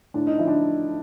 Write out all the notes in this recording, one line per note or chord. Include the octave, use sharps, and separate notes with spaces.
A2 D4
D#4
F3 E4
D4